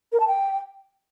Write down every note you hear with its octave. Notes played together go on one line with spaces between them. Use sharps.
A#4
A5
G5